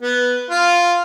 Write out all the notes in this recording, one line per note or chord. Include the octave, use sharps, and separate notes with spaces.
B3
F4